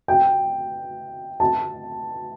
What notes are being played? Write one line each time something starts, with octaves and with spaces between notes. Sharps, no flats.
G5
A5